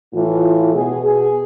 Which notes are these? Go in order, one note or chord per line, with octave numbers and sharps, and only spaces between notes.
A2 E3 F4
B2 G#4
G#4